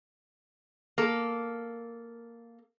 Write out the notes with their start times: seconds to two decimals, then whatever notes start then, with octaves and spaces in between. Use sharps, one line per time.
0.98 A#3 A4